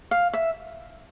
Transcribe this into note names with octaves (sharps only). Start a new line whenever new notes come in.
F5
E5